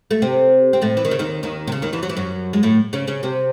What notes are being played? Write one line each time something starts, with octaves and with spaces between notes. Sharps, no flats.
A3
C3 C4
C4
A2 A3
E3
D#3
C#3
D#2 D#3
D#2 D#3
C3
C#3
D#2 D#3
E2 E3
F#3
E3
F#2 F#3
G#3
A2 A3
C#3 C#4
C#3 C#4
C3 C4